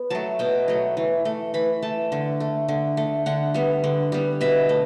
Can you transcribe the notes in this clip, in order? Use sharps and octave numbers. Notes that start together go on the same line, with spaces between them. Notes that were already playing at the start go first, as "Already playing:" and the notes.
Already playing: B3
F#3 A3 A5
B2 G5
F#3 A3
E3
A3
E3 B5
A3 A5
D3
A3
D3
A3
D3 F#5
G3 B3
D3
G3 B3
B2 E5
A3